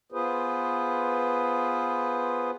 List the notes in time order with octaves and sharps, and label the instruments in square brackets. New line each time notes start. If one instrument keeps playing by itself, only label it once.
[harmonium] B3 F4 G#4 B4 C5